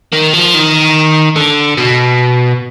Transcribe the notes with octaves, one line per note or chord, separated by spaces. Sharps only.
D#3
F3
D#3
D3
B2